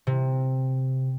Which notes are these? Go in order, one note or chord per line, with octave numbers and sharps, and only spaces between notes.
C3